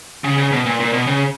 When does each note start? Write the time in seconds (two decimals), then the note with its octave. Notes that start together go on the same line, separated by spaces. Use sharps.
0.24 C#3
0.38 C#3
0.52 B2
0.66 A#2
0.80 A#2
0.93 B2
1.07 C#3